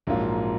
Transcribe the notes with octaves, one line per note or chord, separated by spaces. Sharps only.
A#1 G#2 F#3 A#3 F4